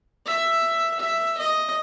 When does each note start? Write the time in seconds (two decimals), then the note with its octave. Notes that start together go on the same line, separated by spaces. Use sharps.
0.26 E5
1.00 E5
1.37 D#5